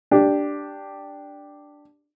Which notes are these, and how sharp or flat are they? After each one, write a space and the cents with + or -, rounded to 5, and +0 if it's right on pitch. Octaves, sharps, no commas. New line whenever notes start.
D4 +0 G4 +0